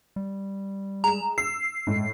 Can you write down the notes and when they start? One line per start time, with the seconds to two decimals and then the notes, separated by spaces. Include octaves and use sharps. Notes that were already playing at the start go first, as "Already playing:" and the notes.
0.16 G3
1.04 G#3 A#5 E7
1.38 E6 C7
1.87 A2 G#3